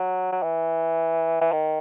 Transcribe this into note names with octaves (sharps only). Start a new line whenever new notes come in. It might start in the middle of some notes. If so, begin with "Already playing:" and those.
Already playing: F#3
F#3
E3
E3
D#3